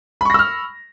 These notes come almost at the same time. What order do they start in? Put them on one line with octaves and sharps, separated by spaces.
B5 C#6 A#6 E6 F6